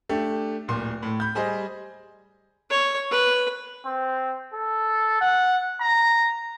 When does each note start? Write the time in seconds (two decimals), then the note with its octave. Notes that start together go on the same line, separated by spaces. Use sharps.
0.09 A3 D4 G4
0.68 D1 A#2 C6
1.02 A2
1.20 B5 G6
1.35 G3 G#4 C5 D#5
2.70 C#5
3.11 B4
3.85 C4
4.54 A4
5.21 F#5
5.81 A#5